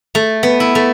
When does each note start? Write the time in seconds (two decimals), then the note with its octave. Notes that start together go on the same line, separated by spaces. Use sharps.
0.15 A3
0.43 B3
0.60 E4
0.75 A3